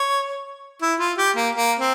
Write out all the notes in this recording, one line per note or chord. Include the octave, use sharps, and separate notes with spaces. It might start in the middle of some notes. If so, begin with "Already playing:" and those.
Already playing: C#5
E4
F4
G4
A#3
A#3
C4